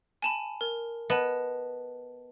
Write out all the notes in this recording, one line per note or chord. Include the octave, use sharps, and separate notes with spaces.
G#5 A5 B5
A#4
B3 D#5 A5